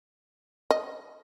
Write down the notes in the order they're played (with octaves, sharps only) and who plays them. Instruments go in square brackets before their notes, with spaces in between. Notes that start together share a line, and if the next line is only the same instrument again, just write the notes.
[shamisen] D#5